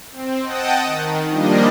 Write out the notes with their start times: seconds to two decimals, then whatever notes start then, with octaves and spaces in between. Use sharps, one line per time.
0.12 C4
0.43 D#5 F#5 G5 A5 D#6
0.85 D#3
1.30 F3 G3 A#3 D4 D#5